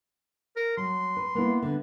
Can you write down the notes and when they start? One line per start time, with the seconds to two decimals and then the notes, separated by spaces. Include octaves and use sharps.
0.56 A#4
0.77 F#3 C6
1.17 B4
1.35 A#3 B3 E4
1.62 D3 B3